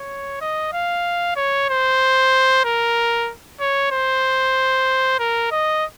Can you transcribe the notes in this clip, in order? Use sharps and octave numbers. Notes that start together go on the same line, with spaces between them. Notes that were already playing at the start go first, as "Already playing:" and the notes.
Already playing: C#5
D#5
F5
C#5
C5
A#4
C#5
C5
A#4
D#5